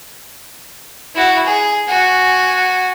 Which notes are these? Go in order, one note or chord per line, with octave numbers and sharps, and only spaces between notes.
E4 F#4
G#4
F#4 G#5